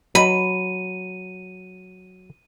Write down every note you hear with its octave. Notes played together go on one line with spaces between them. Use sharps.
F#3 B5 D#7